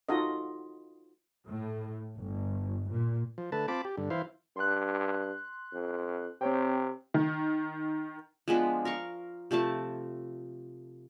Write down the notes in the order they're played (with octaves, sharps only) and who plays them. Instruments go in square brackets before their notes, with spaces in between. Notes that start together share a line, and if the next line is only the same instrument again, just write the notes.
[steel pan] D#4 F4 F#4 A4 D#5
[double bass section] A2
G1
A#2
[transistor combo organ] F3
D3 A3 B4 A5
C4 F4 A5 B5 D6
G4
G2 D3
E3 E4 C5 F5
[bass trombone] G2 [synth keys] C6 F#6
[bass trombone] F2
[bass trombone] C3 [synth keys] C4 C#5 G5
[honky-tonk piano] D#3
[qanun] F3 G#3 B3 D4
A#4 F5 C#6
C3 F3 A3 A5